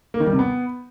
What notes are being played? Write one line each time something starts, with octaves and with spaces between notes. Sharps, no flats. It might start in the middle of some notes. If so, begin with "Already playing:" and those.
A#3
D#3
G3
C3
B3